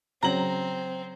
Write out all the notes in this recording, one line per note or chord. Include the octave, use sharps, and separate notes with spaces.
C#3 F#3 C4 A#5 F#7